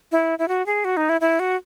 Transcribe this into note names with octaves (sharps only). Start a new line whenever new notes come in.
E4
E4
F#4
G#4
F#4
D#4
E4
E4
F#4